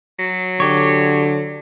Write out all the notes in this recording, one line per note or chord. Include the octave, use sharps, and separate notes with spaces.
F#3
D3 G4 C#5